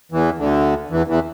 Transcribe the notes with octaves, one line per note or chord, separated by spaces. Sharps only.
E2 E3
D2 D3
E2 E3
E2 E3